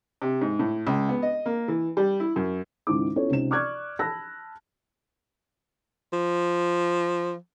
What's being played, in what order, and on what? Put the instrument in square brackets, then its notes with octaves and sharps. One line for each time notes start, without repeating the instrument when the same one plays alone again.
[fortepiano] C3
G#2
A2
C#2
B3
D#5
A#3
E3
G3
E4
F#2
[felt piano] C#2 G#2 D#3 E4 D6
B3 C#4 E4 F4 A4 C#5
C#2 C3 C#4 D#4 E7
D5 C#6 D6 F6 F#6 G#6
A5 B5 E6 F#6 A#6
[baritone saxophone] F3